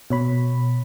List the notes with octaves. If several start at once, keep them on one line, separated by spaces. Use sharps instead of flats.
B2 C#5 B5